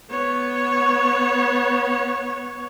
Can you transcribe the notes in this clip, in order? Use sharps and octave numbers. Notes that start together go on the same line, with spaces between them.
B3 C#5